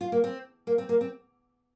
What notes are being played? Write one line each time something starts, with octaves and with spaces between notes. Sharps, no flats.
F4
A#3
C4
A#3
C4
A#3
C4